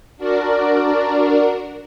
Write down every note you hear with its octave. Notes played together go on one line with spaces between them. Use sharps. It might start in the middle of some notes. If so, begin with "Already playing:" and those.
D4 F#4 A#4 D5